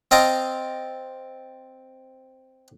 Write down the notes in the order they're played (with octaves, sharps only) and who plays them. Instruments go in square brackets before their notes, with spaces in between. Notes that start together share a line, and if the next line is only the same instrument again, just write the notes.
[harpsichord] C4 D#5 F5 G5 A5 A#5